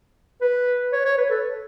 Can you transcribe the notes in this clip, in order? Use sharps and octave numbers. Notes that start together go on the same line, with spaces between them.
B4
C#5
C#5
B4
A4